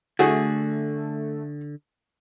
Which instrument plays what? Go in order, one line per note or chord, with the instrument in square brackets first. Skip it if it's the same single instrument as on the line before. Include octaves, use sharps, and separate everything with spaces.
[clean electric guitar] D3 [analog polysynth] A3 [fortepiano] F#4 G#4